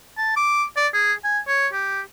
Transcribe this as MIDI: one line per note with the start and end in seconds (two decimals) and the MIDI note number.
0.18 0.33 81
0.37 0.64 86
0.77 0.88 74
0.94 1.13 68
1.24 1.40 80
1.48 1.67 73
1.73 2.01 67